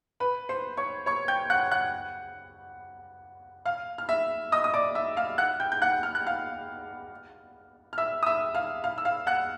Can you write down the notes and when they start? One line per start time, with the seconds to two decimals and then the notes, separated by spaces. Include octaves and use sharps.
0.20 B4 B5
0.49 C5 C6
0.77 C#5 C#6
1.06 C#5 C#6
1.28 G5 G6
1.50 F#5 F#6
1.71 F#5 F#6
3.66 F5 F6
3.98 F6
4.09 E5 E6
4.52 D#5 D#6
4.64 D#6
4.74 D5 D6
4.95 E5 E6
5.17 F5 F6
5.38 F#5 F#6
5.60 G5 G6
5.72 G6
5.82 F#5 F#6
6.03 F6
6.15 F#6
6.27 F5 F6
7.93 F6
7.98 E5 E6
8.23 D#6
8.26 E5 E6
8.55 F5 F6
8.84 F5 F6
8.98 E6
9.05 F5 F6
9.27 F#5 F#6